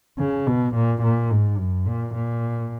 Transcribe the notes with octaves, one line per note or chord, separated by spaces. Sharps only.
C#3
B2
A#2
A#2
G#2
F#2
A#2
A#2